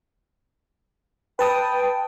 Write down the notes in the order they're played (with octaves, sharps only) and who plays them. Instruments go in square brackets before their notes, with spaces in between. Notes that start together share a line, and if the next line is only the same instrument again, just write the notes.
[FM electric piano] B4 A5 D#6 [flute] G5